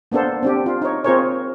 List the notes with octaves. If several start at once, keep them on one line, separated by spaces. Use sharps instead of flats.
A#3 B3 D4 A4 C5
C4 D4 G4
F4
D#4 C#5
C4 F4 G#4 A#4 C5 C#5